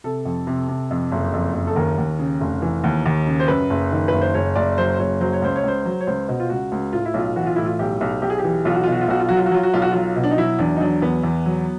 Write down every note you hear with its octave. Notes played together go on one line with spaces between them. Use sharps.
C3 A4
F2
C3
C3
F2
F#1
F2
F#1
A4
D#2 A#4
D#2
C#3
F1
E3
D#2
D#2
C#3
C5
F#2 B4
F#1
D#3
F#1 B4
C5
F#1 C#5
F#1 D5
F#3 C5
F#1 C#5
F#3 C5
C#5
C#2 C5
C#5
C#2 C5
F#3
C#5
C#2 C5
B2
F4
C#2 F#4
C#2
A2 F4
E4
B1 F4
E3 F#4
F4
A2 E4
F4
B1 G4
B1
B1 G4
G#4
G4
E3
B1 F4
F#4
B2 F4
F#4
F4
B1 F#4
F4
F#3 F#4
F4
F#4
F#3 F4
F#4
B1 F4
F#4
F#3 F4
B2
D4
D#4
F#3 E4
E2 D4
D#4
F#3 D4
E2 B3
E2
F#3